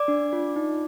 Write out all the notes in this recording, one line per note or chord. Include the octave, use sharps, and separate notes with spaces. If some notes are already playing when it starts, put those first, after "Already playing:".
Already playing: D5 D6
D4
F4
D#4